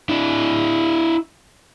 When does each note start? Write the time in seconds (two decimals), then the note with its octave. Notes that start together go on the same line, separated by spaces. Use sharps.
0.09 D4 E4